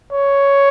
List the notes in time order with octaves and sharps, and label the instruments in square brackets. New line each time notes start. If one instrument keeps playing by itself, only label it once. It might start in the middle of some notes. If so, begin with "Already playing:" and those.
[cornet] C#5